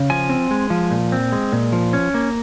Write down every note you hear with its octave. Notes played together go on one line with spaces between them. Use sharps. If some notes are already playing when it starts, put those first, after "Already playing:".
Already playing: C#3
F3 G#5
C4
G#3
F3
A#2
C4
G#3
A#2
F3
C#4
A#3